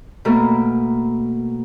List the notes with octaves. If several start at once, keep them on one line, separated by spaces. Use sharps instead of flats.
B2 A3 A#3 A#4